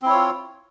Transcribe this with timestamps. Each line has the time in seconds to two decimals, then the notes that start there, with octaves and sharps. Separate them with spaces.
0.02 C4
0.06 E4
0.10 C#5
0.14 F4